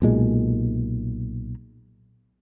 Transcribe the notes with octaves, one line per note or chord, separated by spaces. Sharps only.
B1 A#2 G#3